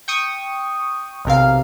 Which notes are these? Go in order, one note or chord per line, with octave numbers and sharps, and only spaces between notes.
G5 C#6 D#6
B1 C3 A#4 F5